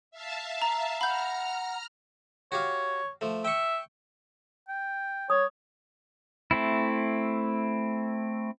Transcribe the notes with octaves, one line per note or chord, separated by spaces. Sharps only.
E5 F5 A5
A#5
F#5 A#5 B5 F6 G6
F#4 G4 C#5 F5
F3 A3
E5 G5 C#6
G5
C#5 D#6
A3 C4 E4